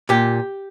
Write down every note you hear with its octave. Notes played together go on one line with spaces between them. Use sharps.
A#2 G4